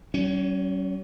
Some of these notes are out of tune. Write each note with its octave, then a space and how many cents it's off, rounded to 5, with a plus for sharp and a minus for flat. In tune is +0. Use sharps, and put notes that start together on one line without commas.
F#3 +45 C#4 +0